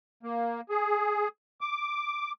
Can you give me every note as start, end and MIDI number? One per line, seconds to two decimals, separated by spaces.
0.23 0.61 58
0.69 1.28 68
1.61 2.32 86